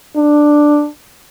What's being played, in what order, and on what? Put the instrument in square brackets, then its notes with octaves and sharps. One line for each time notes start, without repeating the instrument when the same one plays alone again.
[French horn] D4